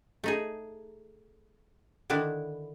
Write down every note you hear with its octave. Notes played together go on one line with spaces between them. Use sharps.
A3 D#4 G#4
D3 D#3 D4 E4